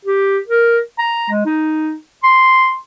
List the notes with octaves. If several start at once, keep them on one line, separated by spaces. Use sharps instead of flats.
G4
A#4
A#5
G#3
D#4
C6